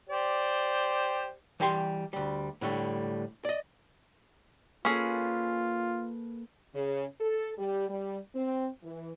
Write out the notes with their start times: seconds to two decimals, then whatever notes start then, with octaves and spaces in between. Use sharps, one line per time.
0.09 G4 C5 D5
1.60 E3 G3 G4 G5 A#5 C6
2.13 D2 G3
2.61 A2 D3 G3 A3
3.45 D5 D#5
4.85 A#3 C#4 F4 G#4 A4 B4
6.74 C#3
7.20 A4
7.58 G3
7.89 G3
8.35 C4
8.82 E3